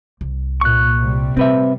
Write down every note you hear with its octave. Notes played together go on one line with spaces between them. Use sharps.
C2
A#2 C#6 F#6
C3 G3
A#2 A3 C4 B4 E5